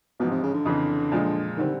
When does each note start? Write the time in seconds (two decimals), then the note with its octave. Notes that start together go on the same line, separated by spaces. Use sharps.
0.20 A1 G#2 B2 F3
0.31 C3
0.43 C#3
0.54 D3
0.65 F2 C#3 E3
1.12 A#2 F3 G#3
1.57 D3 D#3 G3 C4